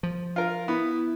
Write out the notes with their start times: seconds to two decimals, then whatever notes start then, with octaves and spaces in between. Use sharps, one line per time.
0.03 F3
0.36 F4 A#4
0.68 B3 E4